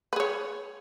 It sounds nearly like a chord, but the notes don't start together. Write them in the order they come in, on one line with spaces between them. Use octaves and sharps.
B4 G#4 C#5